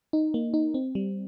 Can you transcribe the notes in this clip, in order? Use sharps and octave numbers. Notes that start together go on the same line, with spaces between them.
D#4
A#3
D#4
C4
G3